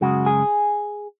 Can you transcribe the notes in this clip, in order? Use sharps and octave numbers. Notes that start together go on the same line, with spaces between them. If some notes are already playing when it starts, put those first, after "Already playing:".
F#2 C#3 G#3 F#4
G#4